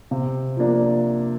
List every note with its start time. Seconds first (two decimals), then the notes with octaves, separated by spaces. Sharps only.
0.11 C3
0.57 F3 A#3 D4